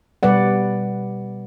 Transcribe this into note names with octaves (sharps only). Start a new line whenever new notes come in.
B2 G3 B4 D5 F#5